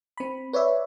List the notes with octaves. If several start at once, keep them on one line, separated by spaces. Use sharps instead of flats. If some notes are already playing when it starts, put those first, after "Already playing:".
C4 B5
B4 C#5 D5 E5